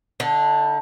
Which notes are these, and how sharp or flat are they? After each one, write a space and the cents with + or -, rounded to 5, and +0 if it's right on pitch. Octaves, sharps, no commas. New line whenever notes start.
D3 +0 D#4 +40